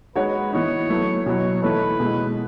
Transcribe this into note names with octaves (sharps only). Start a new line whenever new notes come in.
G#3 D#4 F#4 B4 C#5
E3 B3 D#4 C#5
F#3 A3 E4 B4
B2 F#3 B3 E4 C#5
E3 A3 D#4 A4 B4 C#5
B2 G#3 B3 E4